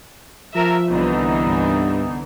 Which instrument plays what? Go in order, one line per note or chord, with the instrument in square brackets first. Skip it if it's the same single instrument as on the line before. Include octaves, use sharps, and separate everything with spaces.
[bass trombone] F3 [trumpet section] A#4 A5 [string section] E5
[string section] C2 D3 E3 [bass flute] B3 [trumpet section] D#4
[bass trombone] G2